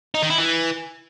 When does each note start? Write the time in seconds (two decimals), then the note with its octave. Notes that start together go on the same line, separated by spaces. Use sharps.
0.14 D#4
0.22 D#3
0.30 E4
0.38 E3